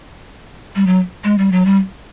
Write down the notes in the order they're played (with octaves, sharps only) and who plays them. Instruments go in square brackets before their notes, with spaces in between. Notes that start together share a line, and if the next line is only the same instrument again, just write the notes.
[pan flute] G3
F#3
G#3
G3
F#3
G3